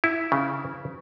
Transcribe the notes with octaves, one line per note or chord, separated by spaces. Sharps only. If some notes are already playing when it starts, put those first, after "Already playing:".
E4
C#3